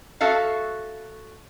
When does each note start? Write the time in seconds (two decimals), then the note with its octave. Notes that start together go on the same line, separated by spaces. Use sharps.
0.21 F#4 A4 E5 F5